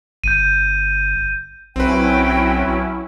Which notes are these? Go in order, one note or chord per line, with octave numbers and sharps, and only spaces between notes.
G1 G6 D#7
B1 F#3 C4 C#4 E4 B4 G5